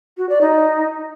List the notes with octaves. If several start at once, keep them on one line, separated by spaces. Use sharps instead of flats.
F#4
D5
D#4